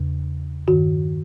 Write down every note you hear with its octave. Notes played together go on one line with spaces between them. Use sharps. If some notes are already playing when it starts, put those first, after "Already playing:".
Already playing: E2 C#3
G2 D#3 F#4